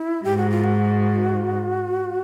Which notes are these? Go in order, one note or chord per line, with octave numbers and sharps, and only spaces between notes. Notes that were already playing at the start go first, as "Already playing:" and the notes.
Already playing: E4
G#2 G4
F#4
F4
F#4